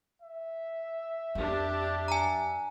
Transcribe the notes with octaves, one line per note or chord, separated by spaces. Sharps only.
E5
F2 D4 G4
G#5 A#5